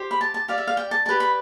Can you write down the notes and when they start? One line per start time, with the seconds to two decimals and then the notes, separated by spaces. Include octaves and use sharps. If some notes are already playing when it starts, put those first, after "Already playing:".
Already playing: G4 C5
0.11 B5
0.21 A5
0.34 A5
0.48 G4 D5 F5
0.58 E5
0.67 F5
0.77 G5
0.91 A5
1.05 G4 B4 D5 A5
1.20 B5